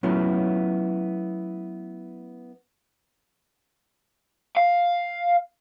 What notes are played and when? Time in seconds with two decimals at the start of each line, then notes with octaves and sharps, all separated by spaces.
0.03 F#3 A3 B3 C#4 E4 F4
4.57 F5